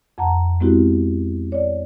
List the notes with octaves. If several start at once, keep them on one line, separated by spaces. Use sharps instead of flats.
F2 F#5 A5 A#5
G#3 B3 C4 E4 F#4 G4
C#5 D5